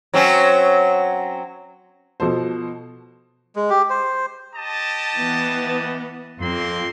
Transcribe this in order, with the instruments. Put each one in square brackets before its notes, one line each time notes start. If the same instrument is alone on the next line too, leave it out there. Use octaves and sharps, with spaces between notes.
[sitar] F#3 C4 C#4
[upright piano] B2 F3 A4 C5
[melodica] G#3
G4
C5
[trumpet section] G4 D#5 A5
[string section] E3 B3
[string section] F2 [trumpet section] A#3 C4 C6